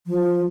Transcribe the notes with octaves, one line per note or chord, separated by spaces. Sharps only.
F3